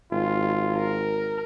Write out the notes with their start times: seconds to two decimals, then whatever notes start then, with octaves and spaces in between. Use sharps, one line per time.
0.12 G#1 F4
0.76 A#4